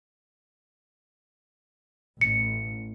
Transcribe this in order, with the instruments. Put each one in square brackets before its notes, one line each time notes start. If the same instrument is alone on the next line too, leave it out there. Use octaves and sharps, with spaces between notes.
[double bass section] A1 [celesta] C#7